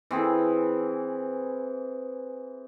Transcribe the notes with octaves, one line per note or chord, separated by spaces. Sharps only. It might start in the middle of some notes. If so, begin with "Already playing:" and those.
E3 C4 G#4